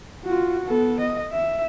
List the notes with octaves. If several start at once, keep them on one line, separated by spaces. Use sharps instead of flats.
F4 F#4
B3 A4
D#5
E5